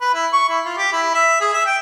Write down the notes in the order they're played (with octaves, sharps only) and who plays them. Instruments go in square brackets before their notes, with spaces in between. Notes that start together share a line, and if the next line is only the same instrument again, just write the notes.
[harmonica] B4
E4
C#6
E4
F4
G4
E4
E5
G#4
E5
G5